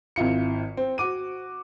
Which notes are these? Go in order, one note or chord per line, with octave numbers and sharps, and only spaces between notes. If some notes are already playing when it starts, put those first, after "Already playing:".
G#1 E4 F4 C#7
C4
F#4 D6 D#7